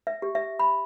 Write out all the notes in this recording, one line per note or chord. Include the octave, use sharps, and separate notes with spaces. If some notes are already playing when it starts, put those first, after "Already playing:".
E5
G4
E5
B5